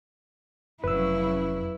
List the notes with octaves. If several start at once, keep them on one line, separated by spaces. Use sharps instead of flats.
F1 C#3 F#3 E4 B4 E6